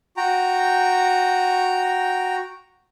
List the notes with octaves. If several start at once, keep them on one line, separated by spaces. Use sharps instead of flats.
F#4 G5 A#5